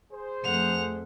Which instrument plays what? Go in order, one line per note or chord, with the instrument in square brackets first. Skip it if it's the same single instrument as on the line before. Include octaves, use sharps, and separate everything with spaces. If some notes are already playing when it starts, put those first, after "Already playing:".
[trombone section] G#4 C5
[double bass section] F2 A3 [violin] F#5 F7